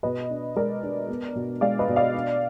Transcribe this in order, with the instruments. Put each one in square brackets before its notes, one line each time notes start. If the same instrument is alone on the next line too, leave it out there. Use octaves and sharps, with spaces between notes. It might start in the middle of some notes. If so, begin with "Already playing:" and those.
[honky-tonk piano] B2 B4 D#5
D4
G#3 A#4 D5
D4
B3
B2
G#3 D5 F5
B4 D#5
B2
D5 F5
D4